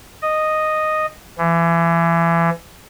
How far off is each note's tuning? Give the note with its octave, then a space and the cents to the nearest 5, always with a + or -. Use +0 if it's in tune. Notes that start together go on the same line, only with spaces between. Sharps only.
D#5 -5
E3 +30